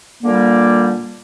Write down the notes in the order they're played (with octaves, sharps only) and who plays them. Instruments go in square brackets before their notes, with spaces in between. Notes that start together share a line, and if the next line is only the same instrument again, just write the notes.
[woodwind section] A#2 D3 G3 A#3